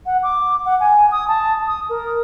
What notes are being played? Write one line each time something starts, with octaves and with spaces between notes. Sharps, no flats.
F#5
D6
F#5
G#5
D#6
A5
D#6
A#4